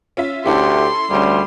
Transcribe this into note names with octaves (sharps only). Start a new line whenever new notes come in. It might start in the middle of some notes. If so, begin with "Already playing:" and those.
C#4 F4 E5
D2 C#4 E4 G4 A4 C6
D2 G3 C#4 G#4